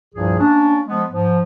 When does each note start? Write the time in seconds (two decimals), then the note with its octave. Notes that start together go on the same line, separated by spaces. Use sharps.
0.14 C2 G2 A#2 F3 G#4
0.39 A#3 C#4 D4
0.87 F3 G#3 B3
1.11 G#2 F3